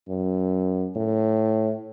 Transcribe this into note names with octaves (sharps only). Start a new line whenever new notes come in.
F#2
A2